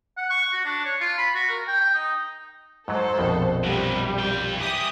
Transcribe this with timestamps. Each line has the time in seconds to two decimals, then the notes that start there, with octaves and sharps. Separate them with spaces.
0.18 F#5
0.30 C#6
0.53 F#4
0.65 D4
0.85 C#5
1.01 F4
1.18 B5
1.35 F#4
1.50 A#4
1.68 G5
1.81 G5
1.94 D#4
2.88 G#2 F#3 A4 C5
3.18 A#1 F2 B2
3.64 C3 F#3 G3
4.18 F4 G5
4.57 E3 G4 D6 D#6